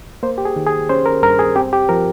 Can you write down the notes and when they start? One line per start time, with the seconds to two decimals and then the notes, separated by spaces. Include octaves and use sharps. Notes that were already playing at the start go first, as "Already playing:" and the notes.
0.23 A#3 C5
0.38 G4
0.45 G#4
0.56 D#3
0.67 G#4
0.89 C#4 C5
1.06 A#4
1.23 G2 A#4
1.39 G#4
1.56 C4 G4
1.73 G4
1.89 F3 A#4